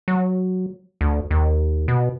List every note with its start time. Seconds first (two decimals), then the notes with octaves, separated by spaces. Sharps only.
0.08 F#3
1.01 D2
1.31 D#2
1.88 B2